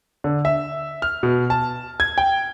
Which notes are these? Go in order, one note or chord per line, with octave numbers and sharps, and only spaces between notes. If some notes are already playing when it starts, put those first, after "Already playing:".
D3
E5
F6
B2
A5
G#6
G5